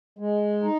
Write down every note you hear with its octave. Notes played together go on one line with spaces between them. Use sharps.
G#3
D#4